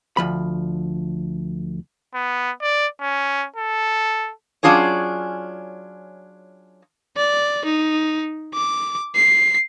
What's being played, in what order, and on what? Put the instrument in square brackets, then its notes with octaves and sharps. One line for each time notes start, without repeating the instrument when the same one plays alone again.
[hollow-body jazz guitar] D2 F3 B5
[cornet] B3
D5
C#4
A4
[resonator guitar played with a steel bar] F#3 C#4 D4 F4 G#4 C#5
[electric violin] D5
D#4
D6
C7